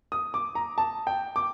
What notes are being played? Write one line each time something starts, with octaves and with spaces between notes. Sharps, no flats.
D#6
D6
A#5
A5
G5
D6